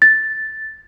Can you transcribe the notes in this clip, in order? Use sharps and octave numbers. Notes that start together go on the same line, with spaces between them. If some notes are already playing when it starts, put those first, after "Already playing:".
A6